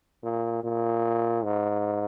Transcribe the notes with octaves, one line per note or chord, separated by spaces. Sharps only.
A#2
A#2
G#2